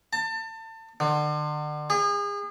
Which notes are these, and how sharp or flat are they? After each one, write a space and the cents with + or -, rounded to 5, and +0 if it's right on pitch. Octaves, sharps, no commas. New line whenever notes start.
A5 +30
D3 +35
G#4 -35